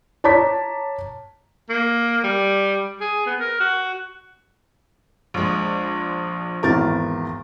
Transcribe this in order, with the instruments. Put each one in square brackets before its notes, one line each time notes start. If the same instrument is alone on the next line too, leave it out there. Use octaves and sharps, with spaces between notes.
[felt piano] C#5 A5 A#5 D6 B6
[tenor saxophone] A#3
G3
G#4
B3
A#4
F#4
[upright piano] A#1 G#3
[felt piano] G#1 E2 A6 [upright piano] A#4